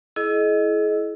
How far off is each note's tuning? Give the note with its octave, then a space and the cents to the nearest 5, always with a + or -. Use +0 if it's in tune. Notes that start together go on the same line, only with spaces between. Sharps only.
E4 +5 G#4 +45 D#5 +0